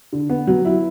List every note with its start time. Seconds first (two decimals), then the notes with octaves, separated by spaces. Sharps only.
0.13 D3
0.30 B3
0.47 F#3
0.65 E4